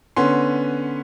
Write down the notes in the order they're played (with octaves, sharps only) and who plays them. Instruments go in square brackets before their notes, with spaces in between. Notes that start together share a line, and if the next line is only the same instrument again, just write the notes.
[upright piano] D3 B3 C#4 C6